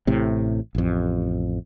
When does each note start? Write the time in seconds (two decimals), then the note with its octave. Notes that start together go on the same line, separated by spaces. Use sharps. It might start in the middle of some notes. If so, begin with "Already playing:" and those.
0.07 A1 A2 C3
0.75 A1 F2